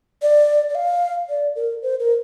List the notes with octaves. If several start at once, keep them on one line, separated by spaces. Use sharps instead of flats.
D5
D5
F5
D5
A#4
C5
A#4